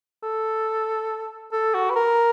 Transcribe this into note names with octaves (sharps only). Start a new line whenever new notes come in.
A4
A4
F#4
B4
A#4